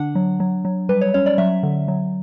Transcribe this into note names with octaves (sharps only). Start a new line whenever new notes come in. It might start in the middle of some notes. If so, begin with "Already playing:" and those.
Already playing: D3 D4 F#5
F#3
F#3
F#3
G3 B4
C#5
C#4 C#5
D5
F#3 E5
D3
F#3